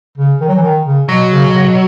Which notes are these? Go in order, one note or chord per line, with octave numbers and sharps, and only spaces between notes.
C#3
D#3
F#3
E3
D#3
C#3
B2 F#3
C#3
B2
C#3
B2